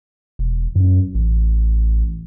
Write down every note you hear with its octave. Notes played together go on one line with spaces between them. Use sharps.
E1
F#2
A1